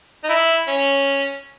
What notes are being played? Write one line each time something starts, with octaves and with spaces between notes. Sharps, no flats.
D#4
E4
C#4